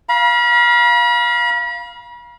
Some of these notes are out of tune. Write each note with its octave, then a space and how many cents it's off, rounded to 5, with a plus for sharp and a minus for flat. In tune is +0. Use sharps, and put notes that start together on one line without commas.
F5 +0 B5 -45